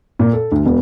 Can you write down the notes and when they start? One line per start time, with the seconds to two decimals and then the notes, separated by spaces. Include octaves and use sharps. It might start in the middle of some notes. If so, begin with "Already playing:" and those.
0.19 A#2
0.33 A4
0.52 D2
0.65 E1